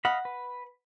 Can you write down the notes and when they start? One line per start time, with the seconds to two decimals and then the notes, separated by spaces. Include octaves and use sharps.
0.05 D#5 F5 F#5 B5
0.25 B4